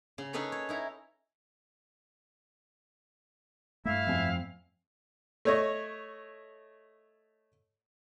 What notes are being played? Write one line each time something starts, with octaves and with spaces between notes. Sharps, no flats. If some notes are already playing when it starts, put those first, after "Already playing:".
C#3
C#4 D#4 G#4 A4 B4 C#5
C#5
D#4 E4 A#5
G2 A3 E4 E5 F5
F2 G#5
A3 C#5 D#5